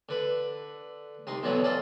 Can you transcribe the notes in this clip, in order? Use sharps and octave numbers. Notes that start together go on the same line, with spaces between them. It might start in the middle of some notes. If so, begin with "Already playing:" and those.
D3 B4
C2 D#4 C6
B1 B2 D3 E3 F#3 B3
F4 A4 C5 D5 D#5